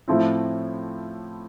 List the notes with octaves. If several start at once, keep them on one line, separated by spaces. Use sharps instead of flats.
A2 F3 A3 C4 E4